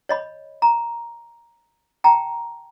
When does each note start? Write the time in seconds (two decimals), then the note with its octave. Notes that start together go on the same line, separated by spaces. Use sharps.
0.09 C#5 D#5 B5
0.62 A#5
2.04 G5 A5 A#5